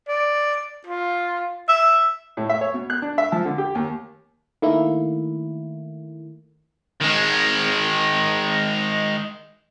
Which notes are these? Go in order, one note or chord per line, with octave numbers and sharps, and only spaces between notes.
D5
F4
E5
A2
E5
C#5
B2
F#6
D4
E5
F3
D3
G4
D#2
D#3 A3 A#3 E4
D#3 G#3